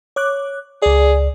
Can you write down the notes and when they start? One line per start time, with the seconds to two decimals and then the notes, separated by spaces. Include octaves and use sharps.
0.16 C#5 D6 F#6
0.82 C#2 G#4 D5